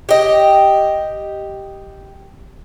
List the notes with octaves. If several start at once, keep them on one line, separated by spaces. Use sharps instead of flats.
G4 D#5